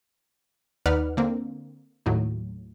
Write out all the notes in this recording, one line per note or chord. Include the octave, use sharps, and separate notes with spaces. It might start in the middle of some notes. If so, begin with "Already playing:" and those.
D#2 D#4 B4 D5 F#5 F6
D3 A#3 C4
D#2 A2 F#3